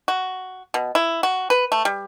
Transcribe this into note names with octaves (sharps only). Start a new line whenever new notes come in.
F#4
B2
E4
F#4
B4
A3
G3